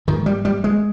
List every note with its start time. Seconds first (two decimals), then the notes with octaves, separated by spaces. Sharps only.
0.07 G#2 D#3
0.26 G3
0.45 G3
0.64 G#3